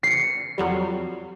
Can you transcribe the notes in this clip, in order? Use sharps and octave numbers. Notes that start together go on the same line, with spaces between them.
C7 C#7
F2 F#3 G3